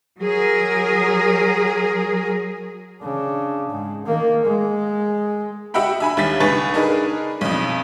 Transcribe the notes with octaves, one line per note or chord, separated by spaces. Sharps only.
F#3 G#4 A#4
C#3 D4
G#2
D#3 A#3
G#3
F#4 D#5 E5 F#5 G5 B5
E5 G#5 B5
D#2 G3 A6 B6
C#2 B4 G#5 C#6 A6
D4 D#4 G#4 A#4 B4
B1 F2